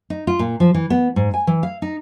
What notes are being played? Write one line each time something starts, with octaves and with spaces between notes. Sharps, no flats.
D#4
F4
A#2
F3
E3
B3
G#2
G#5
E3
F5
D#4